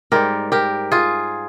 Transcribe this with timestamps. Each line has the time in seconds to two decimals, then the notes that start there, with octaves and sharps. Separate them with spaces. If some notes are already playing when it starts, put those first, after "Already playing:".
0.12 G#2 G3 G4 A#4
0.52 G4 A#4
0.92 F4 G#4